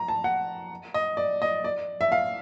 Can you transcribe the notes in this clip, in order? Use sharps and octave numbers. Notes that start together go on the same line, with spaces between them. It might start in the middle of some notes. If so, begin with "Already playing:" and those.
Already playing: A#5
A5
F#5
D#5
D5
D#5
D5
E5
F5